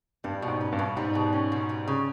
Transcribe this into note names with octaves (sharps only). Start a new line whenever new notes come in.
G2 G3
B2
G#2
C#4
G2
B2
G#2 G3
B2
C#4
B2
G3
C#3